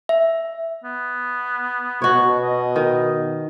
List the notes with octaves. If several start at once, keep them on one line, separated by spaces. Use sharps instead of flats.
E5
B3
B2 F#4 C#5
D#5
D#3